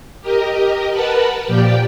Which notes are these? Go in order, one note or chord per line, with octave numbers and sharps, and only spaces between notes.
G4 A#4 D#5
A#4 B4 F#5 A5 B5
A#2 F3 G4 D5 G5